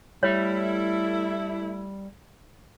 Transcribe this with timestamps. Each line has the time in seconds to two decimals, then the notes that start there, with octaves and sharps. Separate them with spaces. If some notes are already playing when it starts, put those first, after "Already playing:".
0.23 G3 A3 E4 C#5